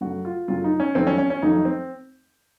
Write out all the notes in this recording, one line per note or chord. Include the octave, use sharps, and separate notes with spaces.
F#2 C#3 F#3 A3 F#4
F4
F#2 C#3 F#3 A3 F4
D#4
C#4
F2 D#3 F#3 A3 C4
C#4
C#4
C#4
F2 D#3 F#3 A3 D#4
C4